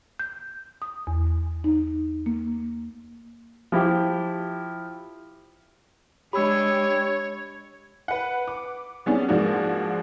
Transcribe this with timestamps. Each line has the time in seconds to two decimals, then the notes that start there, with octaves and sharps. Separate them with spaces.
0.19 G6
0.82 D#6
1.07 E2
1.64 D#4
2.26 A#3
3.72 F3 E4 G4
6.33 G#3 D4 G4 C#5 B5 E6
8.08 B4 F#5
8.48 D6
9.06 G3 B3 C#4 D4 G#4
9.29 G#2 F3 G#3 A#3 D4 F#4